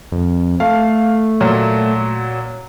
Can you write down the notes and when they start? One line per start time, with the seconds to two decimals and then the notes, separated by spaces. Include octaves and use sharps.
0.12 F2
0.60 A3 F5
1.41 A#2 F#3